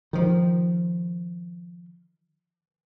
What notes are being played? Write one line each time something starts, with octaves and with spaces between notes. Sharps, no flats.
D#3 F3